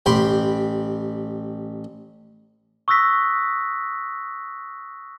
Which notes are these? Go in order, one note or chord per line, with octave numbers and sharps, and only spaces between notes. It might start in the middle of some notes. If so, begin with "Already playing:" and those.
A1 G4 G5 B5 C6
C#6 D#6 E6 F#6 A#6 B6